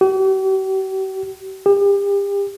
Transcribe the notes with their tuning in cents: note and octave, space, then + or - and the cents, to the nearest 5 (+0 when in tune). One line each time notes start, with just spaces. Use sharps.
G4 -45
G4 +35